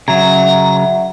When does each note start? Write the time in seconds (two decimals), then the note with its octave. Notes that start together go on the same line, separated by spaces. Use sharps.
0.08 C#3 F#3 E5 F#5 A#5